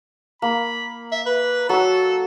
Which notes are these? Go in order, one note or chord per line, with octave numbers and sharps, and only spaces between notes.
A#3 B5
E5
B4
F#3 A4 E5